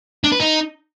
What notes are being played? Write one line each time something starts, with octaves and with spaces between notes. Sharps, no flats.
D4
B4
D#4